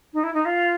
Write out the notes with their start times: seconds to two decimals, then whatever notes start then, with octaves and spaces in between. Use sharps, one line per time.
0.14 D#4
0.24 E4
0.34 D#4
0.45 F4